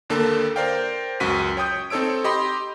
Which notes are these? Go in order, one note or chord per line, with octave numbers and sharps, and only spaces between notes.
D#2 D3 A#3 A4
A#4 C5 D5 F5 G5
C#2 F#2 F#4 B6 D#7
C#5 G5 D#6 G6
C4 D#4 A4 C#5 E6 D7
G4 D#5 B5 C6